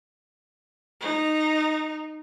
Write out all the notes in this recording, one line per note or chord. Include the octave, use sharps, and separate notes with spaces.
D#4